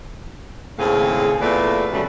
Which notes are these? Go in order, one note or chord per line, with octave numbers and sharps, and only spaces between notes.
D#2 A2 C#3 C4 G#4 F5
E2 A#2 A3 B4 D5 F5
F2 C#3 F#3 G3 A3